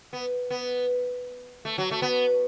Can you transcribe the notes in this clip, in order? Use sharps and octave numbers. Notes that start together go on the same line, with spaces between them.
B3
B3
A3
F#3
A3
B3